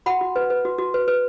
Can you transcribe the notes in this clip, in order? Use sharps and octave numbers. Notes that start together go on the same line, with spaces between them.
F#4 F#5 B5
F#4
B4
B4
F#4
F#4
B4
B4